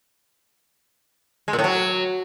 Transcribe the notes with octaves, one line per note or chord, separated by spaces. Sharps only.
G#3
A#2
A2
F#3